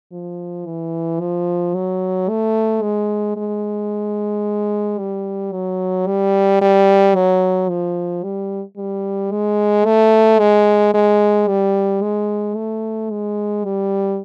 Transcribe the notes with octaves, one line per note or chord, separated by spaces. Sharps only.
F3
E3
F3
F#3
A3
G#3
G#3
G3
F#3
G3
G3
F#3
F3
G3
G3
G#3
A3
G#3
G#3
G3
G#3
A3
G#3
G3